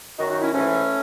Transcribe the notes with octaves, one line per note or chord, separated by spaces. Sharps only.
F#2 D#3 F#3 D#4 F#4
D#4 F#4
C#4 E4
G#2 E3 A3 C#4